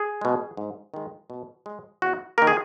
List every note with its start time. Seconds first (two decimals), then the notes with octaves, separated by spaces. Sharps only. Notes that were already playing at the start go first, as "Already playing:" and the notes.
Already playing: G#4
0.21 B2 G#3
0.57 G#2
0.94 D#3 G#3
1.30 B2
1.66 G#3
2.02 E2 F#4
2.38 D#3 A#3 A#4
2.47 G#4